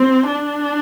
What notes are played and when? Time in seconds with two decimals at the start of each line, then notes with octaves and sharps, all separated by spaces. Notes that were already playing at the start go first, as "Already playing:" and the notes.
Already playing: C4
0.27 D4